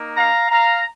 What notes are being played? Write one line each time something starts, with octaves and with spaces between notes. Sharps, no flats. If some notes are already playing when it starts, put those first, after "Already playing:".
Already playing: A#3 D#4
F5 A#5
F5 A#5